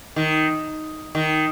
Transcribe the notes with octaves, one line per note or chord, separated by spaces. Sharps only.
D#3
D#3